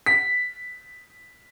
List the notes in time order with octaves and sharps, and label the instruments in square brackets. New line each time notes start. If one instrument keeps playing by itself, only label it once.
[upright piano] B6